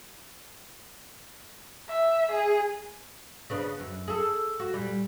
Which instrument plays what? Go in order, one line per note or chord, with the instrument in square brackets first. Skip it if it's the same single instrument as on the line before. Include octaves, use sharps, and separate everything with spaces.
[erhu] E5
G#4
[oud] C#3 B3 D4
F#2
G#4 A4
F#4
A#2 G3